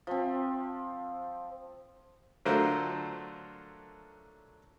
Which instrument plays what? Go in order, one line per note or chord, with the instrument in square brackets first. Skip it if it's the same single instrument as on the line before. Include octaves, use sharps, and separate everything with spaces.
[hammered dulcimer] F3 C4
[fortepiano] D3 F#3 A3 F4 A#4 C5